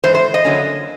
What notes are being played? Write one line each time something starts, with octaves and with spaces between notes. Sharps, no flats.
G#2 E3 C5
C5
D#5
F2 D3 F#3 A#3 C#4